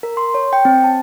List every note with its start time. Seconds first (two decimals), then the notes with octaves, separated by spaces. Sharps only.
0.03 A#4
0.17 C6
0.35 C#5
0.53 G5
0.65 C4
0.84 A5